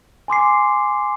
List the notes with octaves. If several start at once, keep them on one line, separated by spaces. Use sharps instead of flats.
G#5 C6 D6 C7